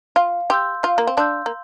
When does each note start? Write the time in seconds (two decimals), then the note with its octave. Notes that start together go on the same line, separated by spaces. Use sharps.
0.16 F4 F5
0.50 G4 C6 E6 G6
0.83 F4 F5
0.98 A#3
1.07 C4
1.17 D4 C6 E6 G6
1.46 A#3